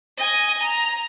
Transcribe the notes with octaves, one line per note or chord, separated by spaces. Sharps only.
D#5 G#5
A#5